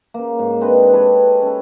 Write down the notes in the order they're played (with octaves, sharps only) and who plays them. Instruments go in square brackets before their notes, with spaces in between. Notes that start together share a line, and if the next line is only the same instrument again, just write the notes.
[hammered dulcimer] C#3 A#3
G#2
C4 D4 B4 D#5
G4 A4 B4 C#5
C#4 A4